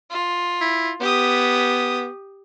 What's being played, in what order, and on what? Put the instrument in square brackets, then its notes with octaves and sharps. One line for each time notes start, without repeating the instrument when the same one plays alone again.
[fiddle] F4
[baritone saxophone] E4
[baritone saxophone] B3 [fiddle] G4 D#6